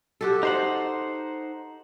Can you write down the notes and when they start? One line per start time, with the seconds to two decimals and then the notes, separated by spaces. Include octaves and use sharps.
0.21 F#4 G4 A4
0.43 D#4 C5 F#5